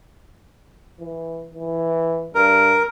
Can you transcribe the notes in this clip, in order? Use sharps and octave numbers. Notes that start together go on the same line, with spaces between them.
E3
E3
G2 A#4